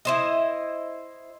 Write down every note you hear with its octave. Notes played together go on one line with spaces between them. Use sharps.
E4 C5 D#5